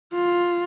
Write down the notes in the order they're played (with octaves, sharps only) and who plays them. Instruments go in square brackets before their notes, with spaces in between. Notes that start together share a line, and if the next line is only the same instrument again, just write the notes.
[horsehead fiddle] F4